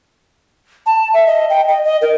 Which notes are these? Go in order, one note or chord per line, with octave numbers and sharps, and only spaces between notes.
A5
E5
D#5
G5
D#5
D#5
A#4